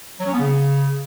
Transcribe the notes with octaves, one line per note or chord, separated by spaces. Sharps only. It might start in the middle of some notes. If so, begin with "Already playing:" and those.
F#3
C#4
B3
C#3